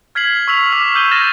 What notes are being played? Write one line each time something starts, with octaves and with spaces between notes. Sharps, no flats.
F6 G#6 B6 C7 F#7
C#6 E6 B6 F7
D6 F6 B6 F7
E6 G6 D#7 G7
F6 G6 A6 A#6 D#7 E7